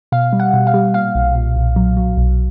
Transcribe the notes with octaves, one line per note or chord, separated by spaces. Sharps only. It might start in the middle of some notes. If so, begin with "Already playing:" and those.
B2 F5
G3
F#5
B2
F5
G3
A#2 F5
B1
A#2
B1
F#3
F#3
B1